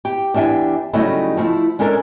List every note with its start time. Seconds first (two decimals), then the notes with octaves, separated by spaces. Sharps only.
0.05 G4
0.34 E2 D4 G4 E5 G#5
0.93 C#3 F#3 G3 A3 D#4 E4
1.37 F3 A3 E4
1.79 G#3 C#4 D4 A4 A#4